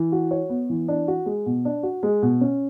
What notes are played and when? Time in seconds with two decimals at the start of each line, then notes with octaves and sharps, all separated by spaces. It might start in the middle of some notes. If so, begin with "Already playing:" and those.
Already playing: E3
0.12 F#4
0.31 C#5
0.50 B3
0.70 E3
0.88 D4
1.08 F#4
1.26 G#3
1.46 B2
1.65 D4
1.83 F#4
2.03 G#3
2.22 B2
2.41 C#4